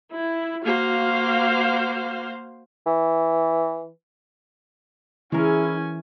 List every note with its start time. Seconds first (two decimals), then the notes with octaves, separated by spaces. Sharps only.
0.12 E4
0.65 A#3 F#4 C5 F5
2.87 E3
5.32 E3 G#3 C#4 E4 A#4 G#5